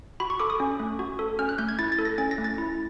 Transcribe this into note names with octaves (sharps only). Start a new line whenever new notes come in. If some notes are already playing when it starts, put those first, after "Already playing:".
F#4 B5
C#6
A4 D6
D#6
C#4
A3
F#4
A4
C#4 F6
F#6
A3 G6
G#6
E4 A6
A6
A4
A#6
C#4 A6
A#6
A3
A6
E4